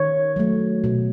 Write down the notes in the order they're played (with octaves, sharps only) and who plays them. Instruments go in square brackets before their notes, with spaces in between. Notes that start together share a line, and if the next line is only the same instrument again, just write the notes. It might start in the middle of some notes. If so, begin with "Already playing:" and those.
Already playing: [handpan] D#3 C#5
F#3 A3
B2